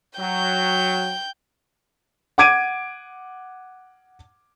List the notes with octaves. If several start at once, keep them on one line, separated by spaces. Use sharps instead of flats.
F#3 G5 G6
F#5 D6 G#6 D7 D#7